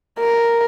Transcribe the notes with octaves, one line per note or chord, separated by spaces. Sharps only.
A#4